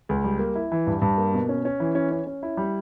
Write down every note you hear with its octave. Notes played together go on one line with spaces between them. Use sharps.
C#2
G3
A#3
E4
E3
G2
G2
A#3
B2
C#4
C#4
E3
C#4
C#4
C#4
E4
G3